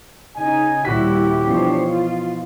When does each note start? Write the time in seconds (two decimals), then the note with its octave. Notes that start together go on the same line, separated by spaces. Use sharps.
0.36 C#3 D#4 G#5
0.85 D#1 G3 E4 F#4 G4 B6
1.47 B2 E3 F3 D4 C5 C#5
1.86 F4